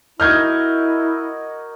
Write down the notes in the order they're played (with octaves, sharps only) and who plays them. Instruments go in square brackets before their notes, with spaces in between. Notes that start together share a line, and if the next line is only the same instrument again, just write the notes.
[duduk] E4 [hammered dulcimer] F#4 A#4 D#5 [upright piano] F6 G6 G#6